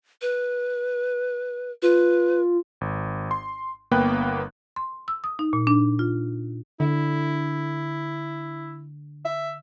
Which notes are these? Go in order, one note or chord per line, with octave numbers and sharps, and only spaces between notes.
B4
F4 B4
G#1
C6
G1 A#3 B3 B4 G5 F#6
C6
E6
D#6
D#4
A#2
D4
F4
D3 E4
E5